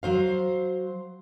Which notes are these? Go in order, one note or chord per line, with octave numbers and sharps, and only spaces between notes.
F#3 C5 F5